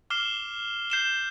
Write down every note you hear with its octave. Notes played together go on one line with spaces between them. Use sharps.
D6 F6 C7 E7 G7
G6 C7 E7 G7